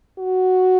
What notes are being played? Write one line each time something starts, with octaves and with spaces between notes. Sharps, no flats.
F#4